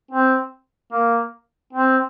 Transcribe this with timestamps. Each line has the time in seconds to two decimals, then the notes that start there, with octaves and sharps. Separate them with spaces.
0.11 C4
0.92 A#3
1.73 C4